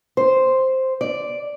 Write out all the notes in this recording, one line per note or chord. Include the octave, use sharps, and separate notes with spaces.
C5
D5